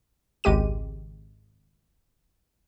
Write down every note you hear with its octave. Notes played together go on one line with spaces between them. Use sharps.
G#1 C#2 G#3 G4 D#7